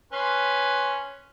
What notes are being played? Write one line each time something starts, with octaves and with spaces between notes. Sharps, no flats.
C#4 B4 C6